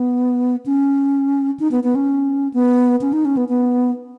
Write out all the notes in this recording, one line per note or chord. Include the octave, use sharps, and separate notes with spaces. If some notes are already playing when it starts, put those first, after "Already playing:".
Already playing: B3
C#4
D#4
B3
B3
C#4
B3
C#4
D#4
C#4
B3
B3